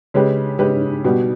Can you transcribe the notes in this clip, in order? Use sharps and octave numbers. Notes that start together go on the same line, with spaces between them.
C#3 G#3 C#4 G4 B4
C#3 G#3 C#4 G4 B4
B2 G3 B3 G4